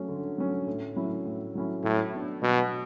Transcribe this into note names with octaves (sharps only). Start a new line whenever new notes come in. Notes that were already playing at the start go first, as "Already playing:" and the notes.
Already playing: F#3 A3 C#4
D3
F#3 A3 C#4
A2
F#3 A3 C#4 E4
A2
F#3 A3 C#4 E4
A2 F#3
B3 D4
B2 F#3